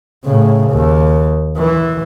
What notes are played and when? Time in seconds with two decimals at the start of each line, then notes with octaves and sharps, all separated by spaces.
0.24 A2 C#3
0.70 D#2
1.57 E3